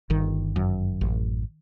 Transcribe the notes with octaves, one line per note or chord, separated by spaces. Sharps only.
G1 D#3
F#2
A1